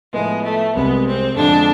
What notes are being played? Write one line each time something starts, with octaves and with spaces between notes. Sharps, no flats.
A2 F3 G#3 B3 E4
A3
C2 C3 G#3 B3
C4
F2 D3 F3 G#3 D4